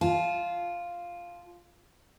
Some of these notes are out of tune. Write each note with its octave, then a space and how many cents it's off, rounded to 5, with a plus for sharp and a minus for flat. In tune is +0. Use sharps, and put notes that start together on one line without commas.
F4 +0 A5 -35